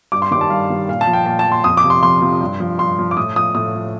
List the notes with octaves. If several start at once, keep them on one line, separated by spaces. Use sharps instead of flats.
G2 D6
C6
D#3 G3 D6
A5
G2 F5
D#3 G3
A#2 F5
A5
F3
G5
A#2 A5
A5
F3
C6
F2 D#6
D6
C3 F3
C6
F2 C6
C3 F3
G2
F3
G2 C6
F3
D6
A2 D#6
F3 D#6
A2 D#6
F3